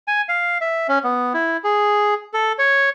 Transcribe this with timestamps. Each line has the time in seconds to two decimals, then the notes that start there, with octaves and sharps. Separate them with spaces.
0.08 G#5
0.29 F5
0.61 E5
0.88 C#4
1.04 B3
1.34 E4
1.64 G#4
2.34 A4
2.59 C#5